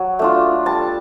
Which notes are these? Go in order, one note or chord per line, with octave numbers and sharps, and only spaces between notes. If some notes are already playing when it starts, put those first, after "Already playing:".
Already playing: F#3
A3 D4 F4
G3 A5